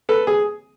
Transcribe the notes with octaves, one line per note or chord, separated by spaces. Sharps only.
A4 B4
G#4